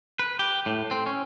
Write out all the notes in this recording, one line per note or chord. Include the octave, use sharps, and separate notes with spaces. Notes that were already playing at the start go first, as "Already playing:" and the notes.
B4
G4
A2
C4
C#4